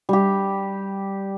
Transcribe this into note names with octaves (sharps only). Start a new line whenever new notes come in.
G3 G4